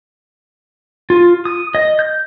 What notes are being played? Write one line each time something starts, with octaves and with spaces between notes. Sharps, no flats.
F4
D#6
D#5
G6